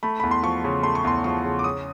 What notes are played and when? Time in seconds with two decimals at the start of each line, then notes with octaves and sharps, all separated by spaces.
0.03 A3 B5
0.20 E2 B5
0.31 C6
0.43 F3 C#6
0.64 C#3
0.83 A3 C6
0.95 C#6
1.04 E2 C6
1.24 F3 C#6
1.44 C#3
1.59 D6
1.64 C#4 D#6